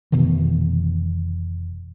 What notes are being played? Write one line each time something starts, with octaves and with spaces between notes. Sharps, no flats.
F1 B2 D#3 E3